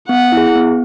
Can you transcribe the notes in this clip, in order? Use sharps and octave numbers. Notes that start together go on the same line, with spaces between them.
B3 F#5
E4
G#4
B3